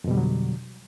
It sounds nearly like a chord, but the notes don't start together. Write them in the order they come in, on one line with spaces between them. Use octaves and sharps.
F2 B2 G3 D3 F#3